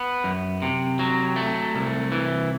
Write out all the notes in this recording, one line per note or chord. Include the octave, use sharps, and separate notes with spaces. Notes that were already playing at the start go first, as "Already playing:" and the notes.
Already playing: B3
F#2
C3
F#3
A3
C2
E3